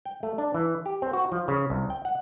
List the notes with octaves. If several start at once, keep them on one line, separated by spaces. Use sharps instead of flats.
G5
A3
D4
E3
G4
C4
F#4
F3
C#3
C2
G5
F#5